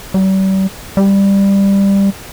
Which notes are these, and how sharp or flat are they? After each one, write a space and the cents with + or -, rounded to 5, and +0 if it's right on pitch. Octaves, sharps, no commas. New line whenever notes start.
G3 -40
G3 +10